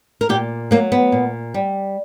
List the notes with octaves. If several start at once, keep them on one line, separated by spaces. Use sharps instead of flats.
A#4
A#2 G4
F#3 A#3
B3
A#2
G3